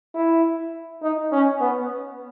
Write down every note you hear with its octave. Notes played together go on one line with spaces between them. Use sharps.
E4
D#4
C#4
B3